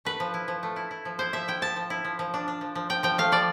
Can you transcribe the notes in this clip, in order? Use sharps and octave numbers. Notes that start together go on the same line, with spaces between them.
A3 B4
F3
E4
F3
A3
E4
E4
F3
E4 C5
F3 E5
E4 G5
F3 A5
F3
E4
F3
F3
D4
D4
F3
F3
F3 G5
F3 G5
A3 F5
F3 D5